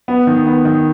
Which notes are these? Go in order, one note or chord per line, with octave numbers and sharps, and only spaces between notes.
B3
D#3
B3
D#3